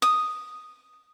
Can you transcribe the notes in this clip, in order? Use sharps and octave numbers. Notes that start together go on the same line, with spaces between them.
D#6